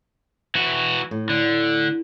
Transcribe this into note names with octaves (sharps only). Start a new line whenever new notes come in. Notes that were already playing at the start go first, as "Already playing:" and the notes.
E3 F#4
A2
D3